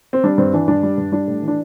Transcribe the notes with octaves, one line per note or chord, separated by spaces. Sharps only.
C4
G3 D4
G2 C4
E3 D4
G2 D4
G3
G2
G3 D4
A2
E3
D4